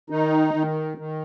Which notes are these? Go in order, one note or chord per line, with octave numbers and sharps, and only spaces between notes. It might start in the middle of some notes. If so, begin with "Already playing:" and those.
D#3 D#4
D#3
D#3